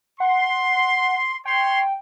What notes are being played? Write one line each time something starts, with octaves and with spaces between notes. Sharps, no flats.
F#5 C6
C#5 G5 C6